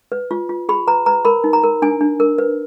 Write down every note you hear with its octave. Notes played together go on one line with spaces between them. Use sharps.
B4
F4
F4
G#4 B5
B4 A#5
B4 A#5
A#4 B5
D#4
A#5
A#4
D4 G#5
D4
A#4
B4